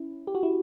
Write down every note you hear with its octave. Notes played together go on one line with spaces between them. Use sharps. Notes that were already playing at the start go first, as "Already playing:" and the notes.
Already playing: C#4 E4
G4
F#4
E4